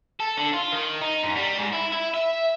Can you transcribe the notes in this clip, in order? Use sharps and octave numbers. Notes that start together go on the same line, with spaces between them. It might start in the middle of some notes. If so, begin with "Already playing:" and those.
A4
D3
F4
D#3
D#4
F#2
G3
G#2
E4
E4
E5